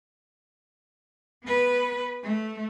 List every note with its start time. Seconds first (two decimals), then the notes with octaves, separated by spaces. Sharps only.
1.44 B3 B4
2.23 A3